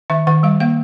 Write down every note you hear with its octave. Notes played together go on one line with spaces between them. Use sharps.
D#3 E5
D#3 F#5
G3 F5
A#3 F5